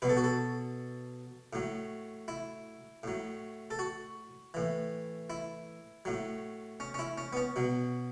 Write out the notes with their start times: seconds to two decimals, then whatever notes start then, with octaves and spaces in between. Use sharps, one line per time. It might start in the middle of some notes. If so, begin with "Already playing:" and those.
0.02 B2 F#3 B4
0.09 A4
0.17 F#4
0.24 A4
1.53 A2 F#3
2.28 E4
3.03 A2 F#3
3.71 A4
3.79 F#4
4.54 A2 E3
5.30 E4
6.05 A2 F#3
6.80 C#4
6.94 C#4
6.99 E4
7.18 C#4
7.33 B3
7.37 C#4
7.56 B2 F#3